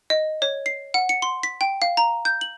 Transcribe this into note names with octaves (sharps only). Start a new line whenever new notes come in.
D#5
C#5
C7
F#5
C#7
C6
B6
G5
F5
A#5
G6
F#7